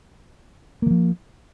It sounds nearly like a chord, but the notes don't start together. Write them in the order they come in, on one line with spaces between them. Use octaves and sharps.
A#3 E3 F3